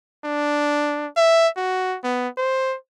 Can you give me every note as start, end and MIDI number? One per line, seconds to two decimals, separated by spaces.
0.25 1.08 62
1.17 1.48 76
1.57 1.97 66
2.04 2.28 59
2.37 2.76 72